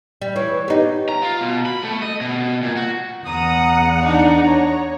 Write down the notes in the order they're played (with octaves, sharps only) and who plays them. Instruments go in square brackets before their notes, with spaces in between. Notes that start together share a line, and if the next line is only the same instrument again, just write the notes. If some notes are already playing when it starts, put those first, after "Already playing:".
[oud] G3
[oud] E3 [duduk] C#5
[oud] B3 D#4 [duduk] G4
[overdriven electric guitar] A#5
F4
B2
B5
A3
D#5
B2
A#2
F#4
[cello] E2 F#5 [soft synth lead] A#5 [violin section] D#6
[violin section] D4 D#4
C#5